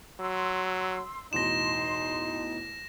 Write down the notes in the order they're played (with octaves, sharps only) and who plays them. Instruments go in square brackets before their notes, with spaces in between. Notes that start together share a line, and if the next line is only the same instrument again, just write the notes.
[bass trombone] F#3 [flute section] C6 E6
[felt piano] A1 E2 B2 [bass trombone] D#4 [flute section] C6 [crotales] A#6 E7